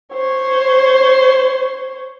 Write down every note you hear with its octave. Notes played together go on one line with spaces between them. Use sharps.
C5 C#5